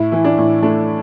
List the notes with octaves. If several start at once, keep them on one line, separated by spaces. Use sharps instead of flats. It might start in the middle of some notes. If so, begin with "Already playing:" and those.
Already playing: A2 E4
E3
D4
A2
A3 D4